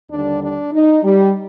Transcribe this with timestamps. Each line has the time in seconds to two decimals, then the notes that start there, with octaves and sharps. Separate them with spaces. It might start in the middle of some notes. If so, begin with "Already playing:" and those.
0.11 D#2 D3 G3 D4
0.42 D4
0.72 D#4
1.03 G3